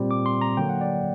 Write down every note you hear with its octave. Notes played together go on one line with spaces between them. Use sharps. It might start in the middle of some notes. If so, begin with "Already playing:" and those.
Already playing: A#2 G3 C4
D6
C6
A#5
D3 F#3 A#3 G5
F#5
D5